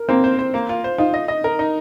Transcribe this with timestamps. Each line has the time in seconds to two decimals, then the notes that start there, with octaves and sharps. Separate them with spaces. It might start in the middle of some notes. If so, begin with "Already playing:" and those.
Already playing: A#4
0.09 A#3 C4
0.24 C5
0.39 C5
0.54 A#3
0.69 F4
0.84 C5
0.98 D#4 F4
1.14 D#5
1.28 D#5
1.44 A#4
1.59 D#4